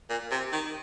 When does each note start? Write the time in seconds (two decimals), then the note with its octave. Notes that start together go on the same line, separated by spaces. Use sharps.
0.09 A#2
0.31 C3
0.52 D#3